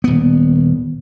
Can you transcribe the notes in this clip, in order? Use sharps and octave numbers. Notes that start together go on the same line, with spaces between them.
D#1 B3